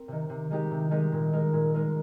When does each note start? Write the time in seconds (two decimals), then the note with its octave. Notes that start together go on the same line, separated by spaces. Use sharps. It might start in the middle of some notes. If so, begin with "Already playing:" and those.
Already playing: C4 A#4
0.08 C3 D#3
0.30 C3
0.50 D#3 G#3 D#4 G4
0.71 C3
0.91 D#3 G#3 D#4 G4
1.12 A#2
1.33 G#3 D#4 A#4
1.53 A#2
1.74 G#3 D#4 A#4